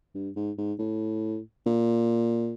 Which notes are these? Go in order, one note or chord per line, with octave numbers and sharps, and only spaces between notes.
G2
G#2
G#2
A2
A#2